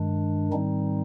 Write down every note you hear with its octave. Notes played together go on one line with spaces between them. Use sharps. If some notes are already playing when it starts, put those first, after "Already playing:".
Already playing: G2 D#3 G#3 D4
G#2 D#3 G3 C4 D#4